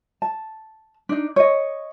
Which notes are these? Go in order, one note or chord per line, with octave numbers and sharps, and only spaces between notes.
A5
D4 D#4
C#5 D#5